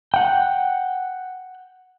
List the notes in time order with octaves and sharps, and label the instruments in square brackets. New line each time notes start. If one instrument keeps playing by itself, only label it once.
[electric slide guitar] F#5 G5